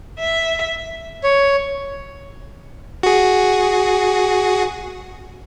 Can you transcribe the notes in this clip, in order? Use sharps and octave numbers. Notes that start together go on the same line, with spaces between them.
E5
C#5
F#4 G#4